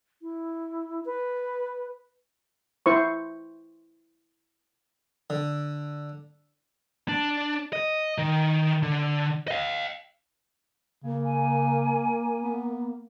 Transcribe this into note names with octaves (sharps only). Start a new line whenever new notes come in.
E4
B4
E4 C5 C#6
D3
D4
D#5
D#3
D3
D#5 F5
C#3 A#3
G#5
B3